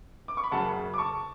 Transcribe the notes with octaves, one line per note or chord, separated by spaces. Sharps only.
D6
C#6
B5
F#1 F#2 C#3 F#5 A5
D6
A5 C#6